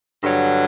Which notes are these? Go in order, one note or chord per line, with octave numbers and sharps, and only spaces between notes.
G2 D3 F#3